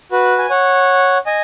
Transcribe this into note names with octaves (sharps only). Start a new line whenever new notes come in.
F#4 B4
G#5
C#5 F#5
D#5 G#5